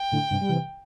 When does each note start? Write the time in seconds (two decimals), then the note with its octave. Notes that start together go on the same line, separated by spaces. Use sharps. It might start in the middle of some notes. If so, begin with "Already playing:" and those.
Already playing: G5
0.12 A2 D3
0.31 G2 C3
0.41 G3
0.49 C3 E3